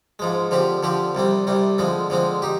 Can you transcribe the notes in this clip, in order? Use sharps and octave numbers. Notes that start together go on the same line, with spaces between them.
G#2 F3 G#3
D3 F3 C4 G4
D3 F3 C4 G4
C2 C3 G3 C4
C2 C3 G3 C4
D3 F3 G#3 C4
D3 F3 G#3 C4
D#4 G4